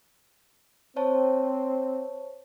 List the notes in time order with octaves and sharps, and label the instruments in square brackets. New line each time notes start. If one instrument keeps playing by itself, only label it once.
[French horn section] C4 [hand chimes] C5 C#5 A5